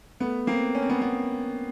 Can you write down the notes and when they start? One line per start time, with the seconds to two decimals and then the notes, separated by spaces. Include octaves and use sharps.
0.20 A3 B3
0.47 A#3 C4
0.75 C#4
0.82 C4
0.90 B3 C#4
1.02 B3 C#4